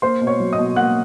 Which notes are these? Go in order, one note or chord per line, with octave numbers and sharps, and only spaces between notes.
A#3 C5 C6
B2
C#5 C#6
F#3
D#5 D#6
B2
A#3 F#5 F#6